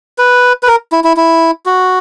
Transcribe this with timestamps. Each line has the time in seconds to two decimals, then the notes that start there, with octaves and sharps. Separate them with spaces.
0.18 B4
0.63 B4
0.67 A#4
0.92 E4
1.04 E4
1.17 E4
1.66 F#4